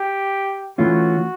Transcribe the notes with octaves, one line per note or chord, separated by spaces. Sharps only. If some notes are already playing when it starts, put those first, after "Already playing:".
Already playing: G4
E3 A3 C#4 F4 F#4